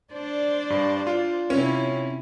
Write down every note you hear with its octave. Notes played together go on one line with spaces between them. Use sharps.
D4 C5 D5
G2
F4
C3 C#4 E4